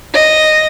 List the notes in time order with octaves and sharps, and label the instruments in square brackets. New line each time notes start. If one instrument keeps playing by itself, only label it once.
[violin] D#5